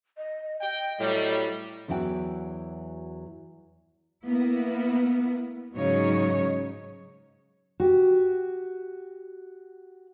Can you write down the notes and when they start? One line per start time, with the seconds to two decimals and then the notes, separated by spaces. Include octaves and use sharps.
0.17 D#5
0.61 D#5 G5
0.99 A2 F#3 G3
1.88 E2 E3 F#3 E4 F#4 G5
4.24 A#3 B3 E4
5.76 G#2 C#3 F#3 D#4 C#5
7.80 F#4 G4